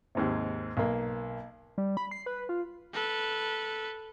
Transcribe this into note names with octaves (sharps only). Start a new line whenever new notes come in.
D#2 G#2 C3
B1 A#3
G3
B5
C7
B4
F4
A4 B4